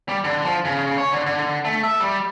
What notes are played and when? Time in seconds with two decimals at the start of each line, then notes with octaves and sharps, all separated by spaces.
0.09 G3
0.24 D3
0.44 F3
0.65 C#3
0.98 C#5
1.12 D3
1.26 D3
1.65 A3
1.83 E5
2.00 G3